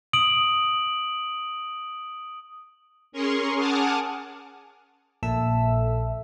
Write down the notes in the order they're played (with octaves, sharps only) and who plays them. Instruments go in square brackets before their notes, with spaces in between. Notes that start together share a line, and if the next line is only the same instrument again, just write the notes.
[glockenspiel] D#6 D7 F#7
[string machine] C#4 G#4 A#4 C6 C#6
F#5 G#5 A5 D6 D#6 F6
[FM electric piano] A#1 A#2 A4 E5 E6